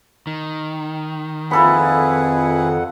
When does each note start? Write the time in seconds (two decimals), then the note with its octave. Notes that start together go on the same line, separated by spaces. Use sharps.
0.27 D#3
1.51 F2 E4 F4 G#4 A4 B4 F#5 B5